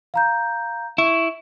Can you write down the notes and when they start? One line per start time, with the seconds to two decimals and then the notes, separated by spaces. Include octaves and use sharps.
0.14 F5 A#5 G6
0.98 E4 C#6